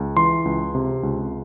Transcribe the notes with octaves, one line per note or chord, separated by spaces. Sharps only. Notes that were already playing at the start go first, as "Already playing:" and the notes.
Already playing: C#2
E3 C6
C#2
C3
C#2